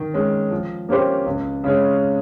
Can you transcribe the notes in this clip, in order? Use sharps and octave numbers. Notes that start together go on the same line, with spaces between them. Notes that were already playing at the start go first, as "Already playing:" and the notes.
Already playing: D#3
G#3 C#4
F3
A#3 C#4 G4 C5
C#2
C#3 G#3 C#4